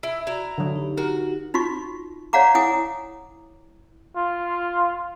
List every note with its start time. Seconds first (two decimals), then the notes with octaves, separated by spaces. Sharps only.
0.03 E4
0.27 E4 F#4 D5 A#5
0.58 D3 F#3
0.76 D#4 G4
0.98 F#4 A#4
1.54 D#4 F4 F#4 C#6
2.33 C#5 D5 F5 F#5 A#5 D6
2.55 E4 F#5 G#5 D6 D#6
4.17 F4